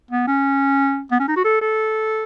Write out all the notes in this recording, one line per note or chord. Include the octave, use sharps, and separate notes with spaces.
B3
C#4
B3
C#4
D#4
F#4
A4
A4